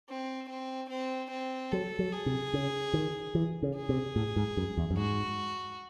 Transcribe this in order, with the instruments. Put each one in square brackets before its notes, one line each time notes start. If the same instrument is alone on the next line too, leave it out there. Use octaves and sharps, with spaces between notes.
[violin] C4
C4
C4
C4
[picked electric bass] F#3 [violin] A4
[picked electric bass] F#3
[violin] G#4
[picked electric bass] C3
C#3
D#3
E3
C#3
[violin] G#4
[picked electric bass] C3
A2
G#2
F#2
E2
F#2
[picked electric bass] G#2 [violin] F#4